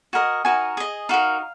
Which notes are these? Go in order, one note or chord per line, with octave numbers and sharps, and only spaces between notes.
F#4 A#4 D#5 G#5
D#4 F#4 A#4 D#5 G#5
G#4 D#5
D#4 F#4 A#4 F5